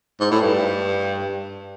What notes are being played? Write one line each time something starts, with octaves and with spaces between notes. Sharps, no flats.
G#2
A2
G2